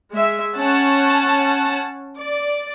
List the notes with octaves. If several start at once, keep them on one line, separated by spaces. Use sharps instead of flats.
G#3 E5
C#4 F#5 A5
D5